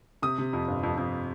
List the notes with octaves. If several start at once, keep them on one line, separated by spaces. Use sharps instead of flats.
C3 D#6
C3
F2
G1
F2
F2